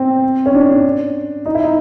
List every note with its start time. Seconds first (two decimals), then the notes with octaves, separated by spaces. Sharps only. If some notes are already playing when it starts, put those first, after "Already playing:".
Already playing: C4
0.46 C#4
0.54 D4
0.70 D4
1.46 D#4
1.55 E4
1.63 D#4